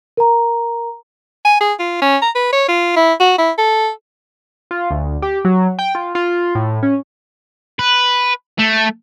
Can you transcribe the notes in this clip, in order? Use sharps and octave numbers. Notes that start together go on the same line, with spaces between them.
A#4 A#5
G#5
G#4
F4
C#4
A#5
B4
C#5
F4
E4
F#4
E4
A4
F4
D2
G4
F#3
G5
F4
F4
A2
C#4
B4
A3